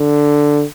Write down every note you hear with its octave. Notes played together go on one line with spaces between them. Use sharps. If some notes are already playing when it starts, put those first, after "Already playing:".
Already playing: D3